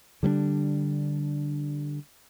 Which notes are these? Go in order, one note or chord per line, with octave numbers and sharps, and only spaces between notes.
D3 G3 B3 D4